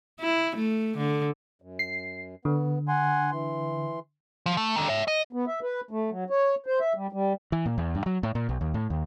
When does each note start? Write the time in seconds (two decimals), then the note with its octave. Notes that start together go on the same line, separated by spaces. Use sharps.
0.20 E4
0.56 A3
0.97 D3
1.62 F#2
1.79 C7
2.45 D3 B3
2.88 F#5 G#5 C6
3.31 E3 C6
4.46 F3
4.57 A3
4.76 D3 D#3
4.88 C#5 E5
5.08 D#5
5.33 B3
5.47 E5
5.63 B4
5.91 A3
6.10 F#3
6.30 C#5
6.66 C5
6.80 E5
6.95 G3
7.12 G3
7.52 E3
7.66 A#2
7.78 E2
7.95 G2
8.06 F#3
8.23 A2
8.35 A#2
8.49 B1
8.61 D#2
8.74 A2
8.90 D#2